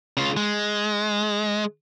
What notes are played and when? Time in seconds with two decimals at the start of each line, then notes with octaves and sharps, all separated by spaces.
0.17 C#3 F4
0.37 G#3